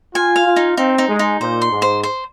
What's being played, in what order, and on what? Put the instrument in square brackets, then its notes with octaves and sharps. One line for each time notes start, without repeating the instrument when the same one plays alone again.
[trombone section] F4 [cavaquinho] G#5
[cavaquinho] F5
[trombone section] F4
[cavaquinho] D#4
[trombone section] C4 [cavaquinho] D#4
[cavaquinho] D#4
[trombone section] G#3
[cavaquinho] D#4
[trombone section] A#2 [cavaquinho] C5
[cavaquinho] C6
[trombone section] G#2
[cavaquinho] C5
C5